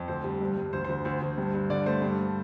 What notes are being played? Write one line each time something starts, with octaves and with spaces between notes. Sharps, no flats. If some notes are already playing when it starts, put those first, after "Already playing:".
Already playing: F2
D2 C5
G3
G2
G2
D2 C5
D2 C5
D2 C5
D2
G2
G2
D3 D5
A3 C5
G2